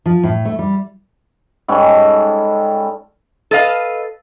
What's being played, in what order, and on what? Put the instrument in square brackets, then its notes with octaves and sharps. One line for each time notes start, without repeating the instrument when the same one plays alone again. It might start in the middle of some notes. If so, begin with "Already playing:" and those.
[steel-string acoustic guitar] F3
A2
A3
G3
[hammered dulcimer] G#2 G3 C#4 A4
[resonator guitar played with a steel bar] A4 B4 D#5 F5